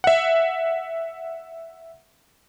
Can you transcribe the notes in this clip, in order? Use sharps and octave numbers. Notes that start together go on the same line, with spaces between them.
E5 F#5